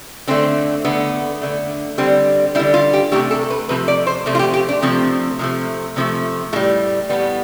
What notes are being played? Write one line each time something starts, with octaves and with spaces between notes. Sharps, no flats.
D3 A3 C4
D3 A3 B3
D3 A3
D3 G3 C4
D3 G3 E4
F4
G4
C3 F3 A3 G4
A4
B4
C3 F3 A3 B4
D5
C5
C3 F3 A3
F4
G4
G4
D4
C3 F3 A3 C4
C3 F3 A3
C3 F3 A3
A2 G3 A3
A2 G3 B3